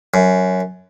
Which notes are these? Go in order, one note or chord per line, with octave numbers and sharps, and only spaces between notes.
F#2